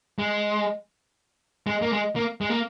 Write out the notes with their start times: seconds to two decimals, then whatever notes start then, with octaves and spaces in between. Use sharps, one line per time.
0.19 G#3
1.67 G#3
1.82 A#3
1.92 G#3
2.16 A#3
2.41 G#3
2.50 A#3